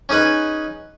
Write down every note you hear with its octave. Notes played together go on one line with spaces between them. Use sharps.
C#4 D#4 G#4 B4